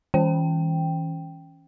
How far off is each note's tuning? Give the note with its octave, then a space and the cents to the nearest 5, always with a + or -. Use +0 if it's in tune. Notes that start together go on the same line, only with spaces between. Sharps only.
E3 -35 C#4 +0 G5 +0